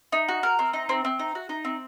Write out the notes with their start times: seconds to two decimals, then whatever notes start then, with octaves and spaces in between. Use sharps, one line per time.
0.12 D#4
0.28 F#4
0.43 A#4
0.59 C4
0.73 D#4
0.89 C4
1.05 C4
1.19 D#4
1.35 F#4
1.49 D#4
1.65 C4